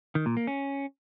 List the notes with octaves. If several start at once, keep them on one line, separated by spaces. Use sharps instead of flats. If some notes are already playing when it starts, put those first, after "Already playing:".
D#3
A#2
A#3
C#4